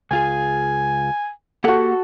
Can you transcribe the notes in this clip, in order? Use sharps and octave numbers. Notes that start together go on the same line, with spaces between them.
C#2 F4 G#4 G#5
A#3 F#4 G4 A4 F#5